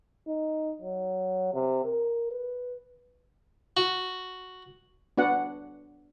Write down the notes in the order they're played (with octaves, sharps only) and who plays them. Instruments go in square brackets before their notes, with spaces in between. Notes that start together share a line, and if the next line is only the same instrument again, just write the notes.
[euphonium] D#4
F#3
C3
A#4
B4
[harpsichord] F#4
[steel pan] B3 D4 F#4 F#5